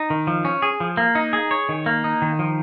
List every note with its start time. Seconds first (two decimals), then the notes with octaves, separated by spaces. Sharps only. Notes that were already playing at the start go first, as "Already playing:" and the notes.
Already playing: D#4
0.10 D#3
0.27 F3
0.45 C#4
0.62 G#4
0.80 F3
0.97 A#3
1.15 D#4
1.33 G#4
1.51 C#5
1.69 D#3
1.86 A#3
2.04 D#4
2.22 D#3
2.39 F3